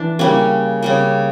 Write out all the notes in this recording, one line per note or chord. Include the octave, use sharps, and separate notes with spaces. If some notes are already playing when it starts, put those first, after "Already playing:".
Already playing: E3 D4
C#3 G3 A#3 C#4
C#3 G3 A#3